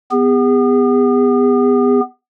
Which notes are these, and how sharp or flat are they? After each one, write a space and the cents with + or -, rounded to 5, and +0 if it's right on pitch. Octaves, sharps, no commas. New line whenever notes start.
B3 +20 G#4 -40